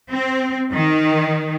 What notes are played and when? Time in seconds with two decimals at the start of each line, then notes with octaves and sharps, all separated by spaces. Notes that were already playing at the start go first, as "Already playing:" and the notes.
0.10 C4
0.72 D#3